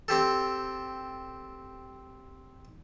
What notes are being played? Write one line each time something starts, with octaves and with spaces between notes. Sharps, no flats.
C4 G4 A4